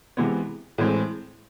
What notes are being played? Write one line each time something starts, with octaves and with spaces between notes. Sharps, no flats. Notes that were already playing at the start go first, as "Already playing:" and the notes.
C3 E3 G#3 B3
A2 E3 G#3 C4